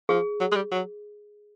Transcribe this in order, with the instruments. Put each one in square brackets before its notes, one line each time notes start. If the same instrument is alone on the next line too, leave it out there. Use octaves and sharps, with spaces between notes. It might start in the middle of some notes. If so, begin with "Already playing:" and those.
[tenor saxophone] F3 [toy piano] G#4
[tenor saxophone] F#3
G#3
G3
F#3